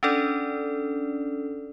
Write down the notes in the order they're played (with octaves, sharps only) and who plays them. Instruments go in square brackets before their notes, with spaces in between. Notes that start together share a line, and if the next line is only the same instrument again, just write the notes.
[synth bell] C#4 D4 A4 D5